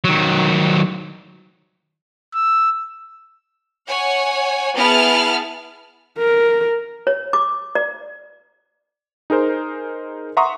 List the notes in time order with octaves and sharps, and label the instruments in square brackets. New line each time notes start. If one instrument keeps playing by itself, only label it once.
[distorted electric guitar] D#3 F#3
[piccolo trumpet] E6
[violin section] C#5 F#5 G#5
B3 E4 G#4 A5 F6
[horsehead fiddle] A#4
[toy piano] C#5
D6
D5
[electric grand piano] D#4 G#4 A#4 C5
E5 F#5 A#5 C6 C#6 D#6